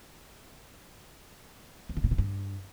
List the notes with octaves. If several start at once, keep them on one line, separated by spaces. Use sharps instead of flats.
E2
C#3
A#2
C3
G2